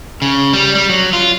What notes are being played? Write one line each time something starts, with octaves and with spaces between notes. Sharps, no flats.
C#3
G3
G3
F#3
F4